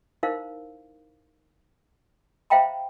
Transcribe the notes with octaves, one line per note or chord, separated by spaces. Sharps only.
D#4 E4 A#4 C5 F5
C5 E5 F5 G5 A#5 B5